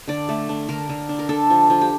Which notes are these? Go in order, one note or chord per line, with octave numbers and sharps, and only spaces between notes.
D3 D5
A3
D4
D3 A#4
D3
D4
A#4
D4 A4
F3
F3
G4